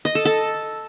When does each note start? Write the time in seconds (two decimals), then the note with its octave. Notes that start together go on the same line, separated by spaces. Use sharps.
0.05 D#5
0.15 A4
0.25 A4